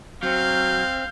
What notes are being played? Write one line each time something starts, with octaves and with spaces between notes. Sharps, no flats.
F#3 C4 F5 F6 G6